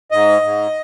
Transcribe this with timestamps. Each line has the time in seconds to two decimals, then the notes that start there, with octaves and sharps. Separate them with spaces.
0.12 G#2 D#5
0.42 G#2